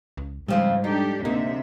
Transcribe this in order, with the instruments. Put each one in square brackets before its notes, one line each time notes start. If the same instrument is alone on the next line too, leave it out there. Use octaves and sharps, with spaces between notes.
[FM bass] C#2
[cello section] G#2 [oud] C#3 F3 C4 [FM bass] G3
[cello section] D4 G4 A4 [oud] D#4
[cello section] D2 C3 E5 [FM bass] A#3 [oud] D#4